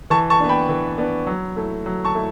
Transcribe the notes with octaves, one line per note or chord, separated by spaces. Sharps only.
E3 A5 C#6
A5 C#6
B3 D4
G5 B5
E3
B3 D4
F#3
A3 E4
F#3
A5 C#6
A3 E4